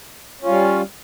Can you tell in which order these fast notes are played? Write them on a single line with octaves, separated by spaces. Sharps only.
C#4 F4 G3